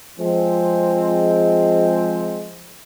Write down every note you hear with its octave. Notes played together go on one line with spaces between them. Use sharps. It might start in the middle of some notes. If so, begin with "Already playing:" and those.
F3 G#3 C4